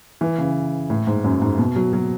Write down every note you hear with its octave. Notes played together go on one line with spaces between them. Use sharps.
E3
C#3
A2
G#2
F#2
G#2
B2
F#3
F#3